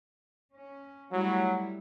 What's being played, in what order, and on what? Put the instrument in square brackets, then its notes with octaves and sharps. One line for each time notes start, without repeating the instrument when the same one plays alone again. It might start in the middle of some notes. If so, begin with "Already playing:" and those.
[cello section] C#4
[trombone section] F#3 [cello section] G3 A3 E4